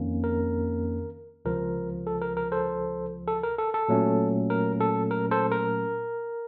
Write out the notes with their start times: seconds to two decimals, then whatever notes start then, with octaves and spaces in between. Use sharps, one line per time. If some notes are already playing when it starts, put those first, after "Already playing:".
Already playing: F2 D#3 A#3 C#4
0.24 A#4
1.45 C#2 C3 F3 A#4
2.07 A4
2.22 A#4
2.37 A#4
2.52 A4 C5
3.28 A4
3.44 A#4
3.58 A4
3.74 A4
3.88 A#2 F#3 A3 C#4
4.50 A#4
4.80 A4
5.11 A#4
5.31 A4 C5
5.52 A#4